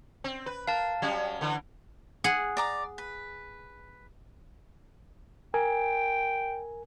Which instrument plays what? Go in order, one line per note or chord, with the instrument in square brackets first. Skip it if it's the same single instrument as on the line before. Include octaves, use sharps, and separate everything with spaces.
[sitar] C4
B4
[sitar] A#4 [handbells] F5 A5
[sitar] F#3 G3 C#4
D3 E3 B4
[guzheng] G#4 F#5
[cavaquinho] D5 A#5 D6
B4
[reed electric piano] A#4 G#5 [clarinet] G5